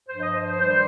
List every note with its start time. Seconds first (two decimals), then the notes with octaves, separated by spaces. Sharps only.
0.07 G2 F3 C5
0.21 D#5
0.33 C5
0.46 C5
0.60 G2 D#3 G3 C5